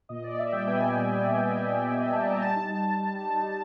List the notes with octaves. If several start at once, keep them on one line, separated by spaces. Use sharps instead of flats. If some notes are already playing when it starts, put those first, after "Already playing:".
A#2 D#5
A#2 D5
A#2 E5
G3 G5
B3 G#5
G3
A#2
A#2
A#2
B3
A#2
G3
G3 G#5
G3 G#5
G3 A5
B3 A#5
G#5
G3 A5
D#4
G3
G3
G3
G3
D#4
G3